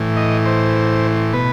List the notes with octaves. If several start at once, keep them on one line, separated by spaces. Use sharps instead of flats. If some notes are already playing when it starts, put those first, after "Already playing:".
Already playing: A2 E3
D#5
C5
B2 B4